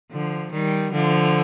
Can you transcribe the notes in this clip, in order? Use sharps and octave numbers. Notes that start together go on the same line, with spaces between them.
D3 F3
D#3 G3
D3 F3